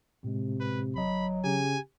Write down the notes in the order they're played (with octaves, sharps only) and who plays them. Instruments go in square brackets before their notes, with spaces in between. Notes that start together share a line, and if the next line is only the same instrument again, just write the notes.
[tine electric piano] A2 G#3 [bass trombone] C3
[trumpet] B4
[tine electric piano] G1 D#5 [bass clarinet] F#3 [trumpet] B5
[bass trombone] C#3 [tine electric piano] G4 [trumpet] G#5